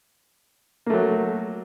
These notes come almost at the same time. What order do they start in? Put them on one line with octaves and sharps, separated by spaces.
A#3 A3 F#3